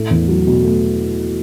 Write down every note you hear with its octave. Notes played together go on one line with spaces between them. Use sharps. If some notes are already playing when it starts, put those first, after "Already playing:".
Already playing: A2 A3
E2
F#3
B2
A3